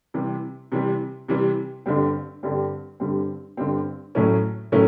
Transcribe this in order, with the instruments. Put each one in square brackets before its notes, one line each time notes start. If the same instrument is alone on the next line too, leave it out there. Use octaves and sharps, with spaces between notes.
[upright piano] C3 E3 G3
C3 E3 G3
C3 E3 G3
G2 D3 G3 C4
G2 D3 G3 C4
G2 D3 G3 C4
G2 D3 G3 C4
A2 F#3 A3 C#4 E4
A2 F#3 A3 C#4 E4